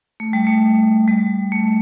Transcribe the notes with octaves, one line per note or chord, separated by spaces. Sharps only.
A3
G3
A3
G3
A3